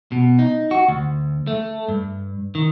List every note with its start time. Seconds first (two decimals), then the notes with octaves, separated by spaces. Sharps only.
0.12 B2
0.39 D#4
0.71 F#4
0.88 D2
1.47 A3
1.88 G2
2.55 D#3